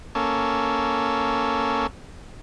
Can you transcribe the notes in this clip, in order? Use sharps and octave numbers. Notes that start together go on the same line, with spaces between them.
A#3 C#4 A4